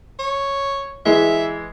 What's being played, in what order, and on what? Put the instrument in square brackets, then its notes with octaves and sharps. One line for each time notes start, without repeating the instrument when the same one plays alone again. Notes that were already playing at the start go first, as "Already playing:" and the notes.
[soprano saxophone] C#5
[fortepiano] E3 G#3 [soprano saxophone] E5